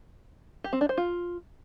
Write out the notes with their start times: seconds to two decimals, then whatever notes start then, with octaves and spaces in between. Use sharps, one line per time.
0.64 G4
0.73 C4
0.81 D4
0.89 C5
0.97 F4